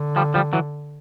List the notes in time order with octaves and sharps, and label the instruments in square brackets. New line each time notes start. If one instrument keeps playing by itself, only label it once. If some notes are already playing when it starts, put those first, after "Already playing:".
Already playing: [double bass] D3
[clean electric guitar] F3 G3
F3 G3
E3 F#3